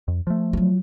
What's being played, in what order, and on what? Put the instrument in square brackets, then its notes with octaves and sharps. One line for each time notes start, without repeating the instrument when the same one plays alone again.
[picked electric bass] F2
F3 A3
[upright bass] F#3 F4